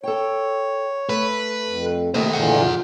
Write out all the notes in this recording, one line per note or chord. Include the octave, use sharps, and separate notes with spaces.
A4 C#5 G5
A3 B4
F2
C3 D#3 A3 A#3 C5 D#5
A#2 D3 E3 G#4 F#5
C3 F3 F4